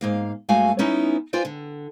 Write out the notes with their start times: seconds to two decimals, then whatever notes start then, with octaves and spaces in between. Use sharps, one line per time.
0.01 G#2 A#3 F5
0.49 G2 G#3 A3 F#4 F5 G#5
0.79 B3 C#4 D#4 E4
1.33 F4 B4 C5 D5 G5 G#5
1.45 D3